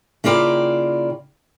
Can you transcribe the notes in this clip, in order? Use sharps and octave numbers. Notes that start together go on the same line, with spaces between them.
C#3 A#3 E4 F4 D5 G5